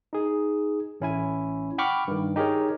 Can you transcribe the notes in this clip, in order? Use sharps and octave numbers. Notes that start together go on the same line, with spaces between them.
D#4 G#4
A1 C#4 E4 G#5
F#5 G5 B5 C#6 D6 F6
G2 D#3
D#4 G4 G#4 A#4 C#5